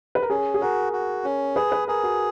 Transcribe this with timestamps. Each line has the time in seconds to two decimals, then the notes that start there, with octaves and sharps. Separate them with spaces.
0.15 B4
0.22 A#4
0.30 C#4 G#4
0.54 G#4
0.61 F#4 A#4
0.93 F#4
1.24 C#4
1.56 G#4 B4
1.72 B4
1.88 G#4 A#4
2.03 F#4